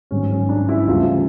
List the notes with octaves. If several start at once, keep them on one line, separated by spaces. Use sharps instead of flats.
G#1 G2 D3 F#3 C#4
C#4
D4
E4
D2 C#3 E3 G3 F4